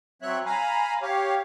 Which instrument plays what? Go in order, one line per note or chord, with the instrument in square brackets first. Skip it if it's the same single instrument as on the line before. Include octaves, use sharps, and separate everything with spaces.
[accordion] F#3 C4 C#5 E5 F#6
F5 G#5 A#5 B5
G4 C#5 F5